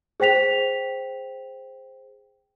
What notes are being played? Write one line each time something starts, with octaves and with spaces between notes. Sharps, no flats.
G#4 C5 G5 B6 F7